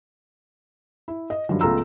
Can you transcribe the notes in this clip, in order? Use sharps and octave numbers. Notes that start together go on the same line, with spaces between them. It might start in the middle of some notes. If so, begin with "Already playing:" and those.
E4
D#5
G2 D#3 F3 F#3
C#2 A3 B3 F4 A#5 E6